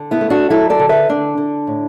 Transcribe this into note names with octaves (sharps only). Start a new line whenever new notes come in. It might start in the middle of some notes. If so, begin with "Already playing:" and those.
Already playing: D3
B3 E4
A3
D4 F#4
F#3 E4 A4
A4 D5
D3
B4 E5
D3 D4
D3
A2